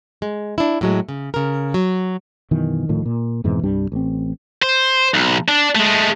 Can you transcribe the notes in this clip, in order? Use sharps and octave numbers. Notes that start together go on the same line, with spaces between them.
G#3
D4 E4
A2 F#3 G#3
C#3
C#3 A#4
F#3
F#2 B2 D#3 E3
D1 A2 D#3 F3
A#2
F2 G#2 B2 E3
C2 G2 G3 D4
A1 C4
C5
B1
D4
G#3 A3